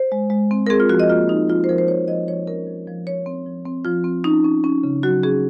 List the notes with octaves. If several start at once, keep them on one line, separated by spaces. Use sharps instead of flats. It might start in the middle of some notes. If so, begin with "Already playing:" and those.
Already playing: C5
G#3
G#3
C4
A#4
C4 G#4
F4
F3 F#4
D#5
A#3 F4
F3 D#4
F3 F4
C5
F3 A#4
C5
F3 C#5
F3 D#5
F3 C#5
C#4 A#4
F3
F3
F3 C#5
C4
F3
C4
F3 F4
C4
C#4 D#4
C#4
C#4
C#3
F#3 F#4
C#4 G#4